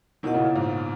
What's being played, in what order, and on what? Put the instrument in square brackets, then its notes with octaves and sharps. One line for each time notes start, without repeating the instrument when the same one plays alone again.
[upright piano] B2 D#3 [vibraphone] E4 A#4 D#5 F#5
[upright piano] A#2 C#3
A#2
G#2